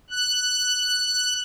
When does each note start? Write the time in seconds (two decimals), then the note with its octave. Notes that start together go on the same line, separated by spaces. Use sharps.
0.10 F#6